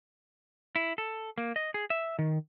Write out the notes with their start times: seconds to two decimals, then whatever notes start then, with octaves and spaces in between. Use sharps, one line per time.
0.76 E4
0.98 A4
1.38 A#3
1.56 D#5
1.74 G#4
1.90 E5
2.19 D#3